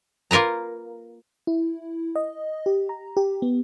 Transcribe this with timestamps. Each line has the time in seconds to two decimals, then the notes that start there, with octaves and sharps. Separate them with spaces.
0.31 A#3 F4 A#4 B4 A#5
1.47 E4
2.16 D#5
2.66 G4
2.89 A#5
3.17 G4
3.42 B3